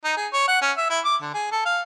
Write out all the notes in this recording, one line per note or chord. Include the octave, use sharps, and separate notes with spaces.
D#4
G#4
C#5
F#5
C#4
E5
E4
D6
D3
G#4
A4
F5